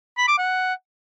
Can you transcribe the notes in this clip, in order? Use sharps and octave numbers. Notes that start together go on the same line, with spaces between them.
B5
D6
F#5